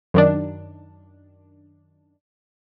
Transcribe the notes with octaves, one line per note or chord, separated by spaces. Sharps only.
F#2 D#3 D4